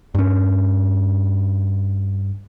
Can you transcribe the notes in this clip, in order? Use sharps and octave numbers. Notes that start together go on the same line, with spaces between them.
G2 C#4